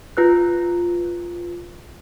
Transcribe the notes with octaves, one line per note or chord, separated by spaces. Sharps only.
F4 B4 F#6